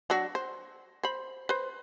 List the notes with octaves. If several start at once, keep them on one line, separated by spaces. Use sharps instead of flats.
F#3 D4 F#4
C5
C5 B5
B4 C5